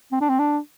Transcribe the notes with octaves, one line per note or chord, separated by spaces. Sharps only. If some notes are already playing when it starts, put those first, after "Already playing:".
C4
D4
C4
D4